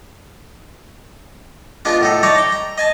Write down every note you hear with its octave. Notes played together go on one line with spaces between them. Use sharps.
G#3 B3 D4 F4 F5
A2 D#4 A4
D#4 C#5 D5 A5 A#5
G5 A#5
A#5
D#5 G#5 A5